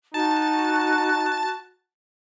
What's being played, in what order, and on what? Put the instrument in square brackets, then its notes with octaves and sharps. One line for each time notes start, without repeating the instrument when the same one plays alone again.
[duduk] D#4 [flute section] F#4 [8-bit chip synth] A5